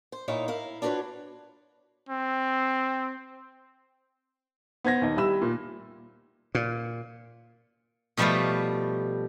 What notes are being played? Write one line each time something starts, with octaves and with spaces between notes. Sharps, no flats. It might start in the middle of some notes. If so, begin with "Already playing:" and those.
C5
A#2 D#4 E4 C#5 E5 F5
E4 A#4 F5
D4 F4 F#4 A#4 B4 C#5
C4
B3 C5 G#6 A#6
D#2 D#4
C2 G3 G4 B5 E6 E7
A#2
A#2
B2 F3 G3 A3 B4 F5